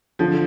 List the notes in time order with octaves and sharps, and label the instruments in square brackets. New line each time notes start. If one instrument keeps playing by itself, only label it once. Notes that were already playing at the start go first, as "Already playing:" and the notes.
[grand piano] D3 [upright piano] F3